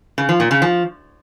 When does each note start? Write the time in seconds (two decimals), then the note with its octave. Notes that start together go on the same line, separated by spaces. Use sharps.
0.18 C#3
0.29 F3
0.40 A#2
0.51 C#3
0.62 F3